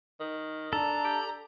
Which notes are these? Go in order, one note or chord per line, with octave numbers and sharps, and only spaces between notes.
D#3
D4 A4 A#5
G4